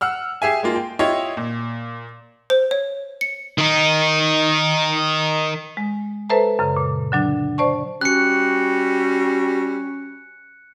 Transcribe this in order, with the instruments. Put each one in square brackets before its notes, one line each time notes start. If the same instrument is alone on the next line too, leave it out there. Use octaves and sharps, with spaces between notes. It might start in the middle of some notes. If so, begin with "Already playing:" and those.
[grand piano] F#5 E6 F6
G4 G#4 E5 G#5
G#3 A#3 F4
G5
E4 F4 G4 C#5 D#5
A#2
[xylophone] C5
C#5
C#7
[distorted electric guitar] D#3 D#4
[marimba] G#3
A4 B4 C5 E5 A5 A#5
F#2 C#3
A#2
D3 F#3 D4
C5 D5 A5 C#6
[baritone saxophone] G3 [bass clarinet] C#4 [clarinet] F#4 [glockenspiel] F#6 C#7